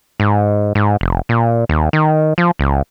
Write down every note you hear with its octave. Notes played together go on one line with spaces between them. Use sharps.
G#2
G#2
F1
A#2
D#2
D#3
F3
C#2